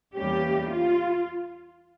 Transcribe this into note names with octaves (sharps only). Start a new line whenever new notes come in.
E2 E3 G3 A#3 C#4 G4
F4